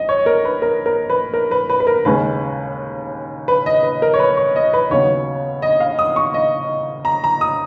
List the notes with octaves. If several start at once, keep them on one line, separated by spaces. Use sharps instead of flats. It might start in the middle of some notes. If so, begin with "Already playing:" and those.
Already playing: G#1 D#5
C#5
A#4
B4
A#4
A#4
B4
A#4
B4
B4
B4
A#4
D#2 C#3 G#3 C#4 B4
B4
D#5
B4
A#4
C#5
B4
C#5
D#5
B4
D#2 C#3 F#3 B3 C#5
D#5
F5
D#6
C#6
D#5
A#5
A#5
D#6